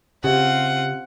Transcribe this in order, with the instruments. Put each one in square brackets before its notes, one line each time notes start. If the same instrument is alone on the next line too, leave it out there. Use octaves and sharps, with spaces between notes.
[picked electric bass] C#3 [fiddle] C4 F4 [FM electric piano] G4 E5 [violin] F#5